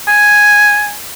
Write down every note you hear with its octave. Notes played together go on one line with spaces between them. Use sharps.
G#5